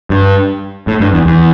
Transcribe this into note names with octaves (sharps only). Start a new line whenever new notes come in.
G2
A2
G2
E2
E2